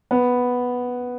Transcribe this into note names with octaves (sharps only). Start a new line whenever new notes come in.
B3